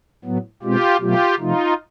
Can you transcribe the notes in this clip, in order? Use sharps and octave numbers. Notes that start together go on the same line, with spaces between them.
A2 F#3 B3
B2 G#3 C4 F4 G4
B2 F#3 A3 F4 G4
C3 F3 A3 D#4 F4